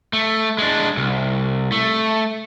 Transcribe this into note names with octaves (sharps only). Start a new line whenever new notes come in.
A3
G#3 D4
C2
A3